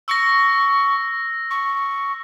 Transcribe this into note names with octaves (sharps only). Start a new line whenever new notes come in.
C#6 E6 A#6
C#6